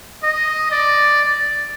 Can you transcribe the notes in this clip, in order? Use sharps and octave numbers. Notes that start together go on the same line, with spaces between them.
D#5
D5